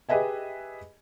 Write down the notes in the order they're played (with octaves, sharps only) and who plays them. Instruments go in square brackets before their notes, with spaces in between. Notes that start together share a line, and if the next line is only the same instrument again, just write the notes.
[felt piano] G4 G#4 B4 D#5 E5 G#5